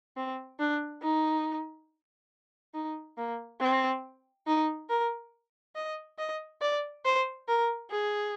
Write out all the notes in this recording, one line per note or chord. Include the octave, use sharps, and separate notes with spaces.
C4
D4
D#4
D#4
A#3
C4
D#4
A#4
D#5
D#5
D5
C5
A#4
G#4